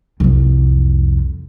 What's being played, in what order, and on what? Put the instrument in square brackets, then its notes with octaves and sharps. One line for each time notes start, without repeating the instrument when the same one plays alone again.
[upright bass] C2 F2